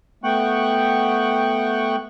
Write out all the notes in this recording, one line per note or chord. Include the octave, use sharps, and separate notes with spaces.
A3 B3 F#5 G5 C#6 F#6